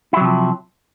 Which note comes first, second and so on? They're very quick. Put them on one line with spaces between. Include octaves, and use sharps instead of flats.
E4 F#3 C3 F3